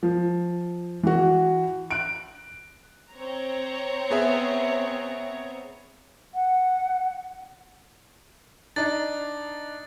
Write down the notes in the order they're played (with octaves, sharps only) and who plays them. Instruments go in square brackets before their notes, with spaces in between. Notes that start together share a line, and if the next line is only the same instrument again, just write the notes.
[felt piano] F3
E3 F#4
F#6 D7
[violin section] C4 C#5 A#5
[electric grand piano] B3 G#4 E5
[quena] F#5
[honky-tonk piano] D4 D#4 [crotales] A6